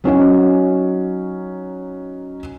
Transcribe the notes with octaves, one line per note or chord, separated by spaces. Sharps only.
F#3 C#4 D#4 F#4